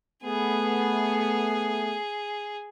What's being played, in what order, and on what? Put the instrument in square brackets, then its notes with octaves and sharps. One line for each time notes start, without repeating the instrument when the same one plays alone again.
[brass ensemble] A3 B3 [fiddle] G#4